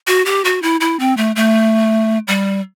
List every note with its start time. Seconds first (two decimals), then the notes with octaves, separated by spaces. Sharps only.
0.07 F#4
0.26 G4
0.45 F#4
0.62 E4
0.80 E4
0.99 C4
1.17 A3
1.36 A3
2.28 G3